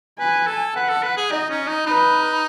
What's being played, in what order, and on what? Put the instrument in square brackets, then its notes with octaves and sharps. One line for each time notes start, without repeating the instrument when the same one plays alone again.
[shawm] B4 [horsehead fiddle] G#5
[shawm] A4
[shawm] B4 [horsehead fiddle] F#5
[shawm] A4
B4
G#4
[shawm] D#4 [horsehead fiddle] D#5
[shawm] C#4
D#4
[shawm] D#4 [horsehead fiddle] B4